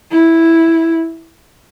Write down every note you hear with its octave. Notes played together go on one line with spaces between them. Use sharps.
E4